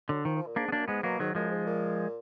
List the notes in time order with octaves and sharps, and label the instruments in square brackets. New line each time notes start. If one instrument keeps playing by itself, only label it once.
[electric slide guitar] D3 [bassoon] F#3
[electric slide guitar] D#3 [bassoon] F3
[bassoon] F3
A#2
[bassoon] G#2 [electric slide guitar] A#3 D4
[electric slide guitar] B3
[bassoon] F#2 [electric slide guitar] A#3 D4
[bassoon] G#2 [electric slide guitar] G#3 B3
[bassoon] B2 [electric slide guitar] F#3 A#3
[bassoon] G#2 [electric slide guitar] D#3 F#3
[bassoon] F#2 [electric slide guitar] F3 G#3
[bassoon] G#2
A#2